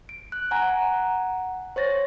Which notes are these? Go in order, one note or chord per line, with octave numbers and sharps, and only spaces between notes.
D7
F#6
F#5 G#5 A#5
C5 C#5 A6 A#6